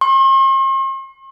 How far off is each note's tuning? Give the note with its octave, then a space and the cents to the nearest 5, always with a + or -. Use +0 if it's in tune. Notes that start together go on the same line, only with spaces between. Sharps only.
C6 +45